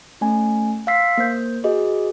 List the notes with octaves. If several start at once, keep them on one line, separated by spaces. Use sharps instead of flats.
A3 C#4 G#5
F5 C6 E6 B6 C7
A#3 C5 G6
F#4 G#4 B4 D#5